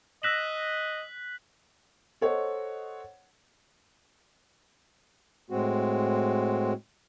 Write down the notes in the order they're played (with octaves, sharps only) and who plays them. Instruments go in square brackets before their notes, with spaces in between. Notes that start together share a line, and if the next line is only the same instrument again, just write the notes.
[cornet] D#5 [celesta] E6 A#6 E7 [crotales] F#6 B6 F#7
[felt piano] A4 C5 C#5 D#5 F#5
[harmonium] A2 G#3 C4 F#4